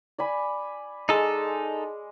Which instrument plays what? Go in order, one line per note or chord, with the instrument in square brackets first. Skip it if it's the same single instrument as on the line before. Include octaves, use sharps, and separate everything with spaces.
[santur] D5 G#5 B5
[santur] G#3 [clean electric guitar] D#4 A4